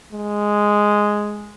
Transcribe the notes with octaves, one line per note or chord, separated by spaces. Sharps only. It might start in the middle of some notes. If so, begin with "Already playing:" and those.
G#3